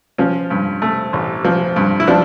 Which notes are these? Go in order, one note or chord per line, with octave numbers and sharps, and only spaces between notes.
F3 C#4
G2
A3
A1
F3
G2
E4
F3 D4